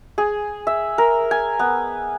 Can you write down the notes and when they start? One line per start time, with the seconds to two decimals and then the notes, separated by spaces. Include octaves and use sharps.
0.18 G#4
0.67 E5
0.98 A#4
1.31 G#5
1.59 B3